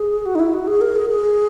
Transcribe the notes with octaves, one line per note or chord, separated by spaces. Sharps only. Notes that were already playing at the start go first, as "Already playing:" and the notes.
Already playing: G#4
F#4
D#4
E4
F#4
G#4
A#4
G#4
G#4